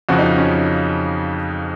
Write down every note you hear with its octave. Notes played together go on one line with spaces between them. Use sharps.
F2 C#3 F3 F#4
D#4
C#4